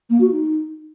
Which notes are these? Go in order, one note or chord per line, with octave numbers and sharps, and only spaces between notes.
A#3
F#4
D#4